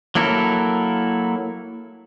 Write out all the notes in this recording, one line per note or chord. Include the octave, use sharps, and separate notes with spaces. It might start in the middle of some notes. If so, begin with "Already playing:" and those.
F#3 A#3 E4 A4 A#4